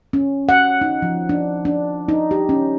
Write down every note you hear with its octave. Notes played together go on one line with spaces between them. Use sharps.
C#4
F#5
D#4
F3
D4
D4
D#4
G4
C#4